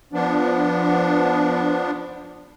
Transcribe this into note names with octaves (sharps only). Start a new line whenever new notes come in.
F3 B3 D4